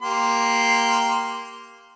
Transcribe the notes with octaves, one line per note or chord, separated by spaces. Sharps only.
A#3 G4 C6